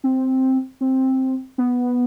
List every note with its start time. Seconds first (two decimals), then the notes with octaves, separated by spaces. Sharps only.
0.04 C4
0.81 C4
1.58 B3